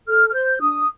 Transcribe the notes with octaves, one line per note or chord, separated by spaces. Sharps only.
A4 F6
F6
C5 G6
D4 D#6